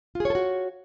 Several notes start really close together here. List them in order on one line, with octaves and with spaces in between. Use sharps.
F4 G#4 C#5 A4 F#4